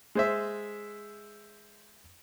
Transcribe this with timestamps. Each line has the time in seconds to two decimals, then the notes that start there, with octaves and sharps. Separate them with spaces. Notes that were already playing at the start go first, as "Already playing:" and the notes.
0.15 G#3 C5 E5